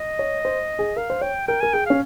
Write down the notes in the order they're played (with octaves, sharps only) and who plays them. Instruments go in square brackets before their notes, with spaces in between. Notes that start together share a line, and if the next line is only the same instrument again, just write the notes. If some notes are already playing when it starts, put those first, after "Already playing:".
Already playing: [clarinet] D#5
[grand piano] C#5
C5
G#4
[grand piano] A#4 [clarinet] F5
[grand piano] C5
[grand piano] C#5 [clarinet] G5
[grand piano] A#4 [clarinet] G5
[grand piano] A#4 [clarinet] G#5
[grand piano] G#4 [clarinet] G5
[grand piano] C#4 [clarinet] F5